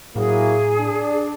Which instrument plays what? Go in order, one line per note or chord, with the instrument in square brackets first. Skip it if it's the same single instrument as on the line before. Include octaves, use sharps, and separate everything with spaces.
[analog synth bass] A2 [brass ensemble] F#3 A#3 E4 [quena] G#4
[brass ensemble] D4